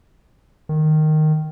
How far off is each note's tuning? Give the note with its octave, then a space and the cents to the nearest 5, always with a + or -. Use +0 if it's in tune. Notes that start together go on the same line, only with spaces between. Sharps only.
D#3 -10